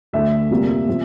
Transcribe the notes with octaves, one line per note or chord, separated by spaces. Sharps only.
D2 D3 A3 E5
F2 C3 G3 A#3
C3 F3